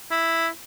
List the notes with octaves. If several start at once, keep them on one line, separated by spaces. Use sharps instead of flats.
E4